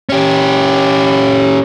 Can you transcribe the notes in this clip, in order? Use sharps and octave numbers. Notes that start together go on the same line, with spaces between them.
C#4 G4